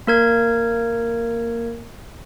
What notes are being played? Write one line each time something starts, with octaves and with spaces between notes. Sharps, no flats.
A#3 A#4 G#6